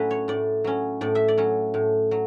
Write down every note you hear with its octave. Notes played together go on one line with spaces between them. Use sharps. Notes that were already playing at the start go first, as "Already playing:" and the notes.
Already playing: A2 F#3 C#4 B4
C#5
A2 D5
F#3 C#4
A2 D5
E5
D5
F#3 C#4
A2
F#3